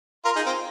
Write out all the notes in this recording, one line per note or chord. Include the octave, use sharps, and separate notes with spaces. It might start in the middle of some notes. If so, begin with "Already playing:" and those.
F4 A#4
D#4 G#4
C4 F4